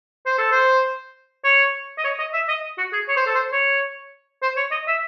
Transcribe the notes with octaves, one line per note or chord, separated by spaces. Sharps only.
C5
A4
C5
C#5
D#5
C#5
D#5
E5
D#5
F#4
G#4
C#5
C5
A4
C5
C#5
C5
C#5
D#5
E5